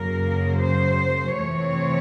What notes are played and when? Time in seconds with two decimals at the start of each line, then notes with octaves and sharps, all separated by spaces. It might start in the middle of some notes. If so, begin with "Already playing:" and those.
Already playing: F#2 C#3 F#3 A#3 A#4
0.58 C5
1.38 F2 C3 E3 A3 C4 C#5